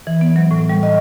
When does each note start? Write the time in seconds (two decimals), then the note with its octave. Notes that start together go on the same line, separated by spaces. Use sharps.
0.07 E3
0.21 B3
0.36 F#3
0.51 A2
0.69 G3
0.83 D#5